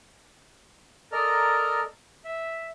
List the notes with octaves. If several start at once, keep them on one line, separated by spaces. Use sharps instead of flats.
A4 A#4 D5 D#5 A#5 F6
E5